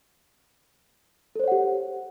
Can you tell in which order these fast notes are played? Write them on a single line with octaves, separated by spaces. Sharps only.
A4 C5 C#5 F#5 G4